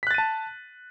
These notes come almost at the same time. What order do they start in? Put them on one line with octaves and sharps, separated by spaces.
B6 F#6 A6 D#7 A5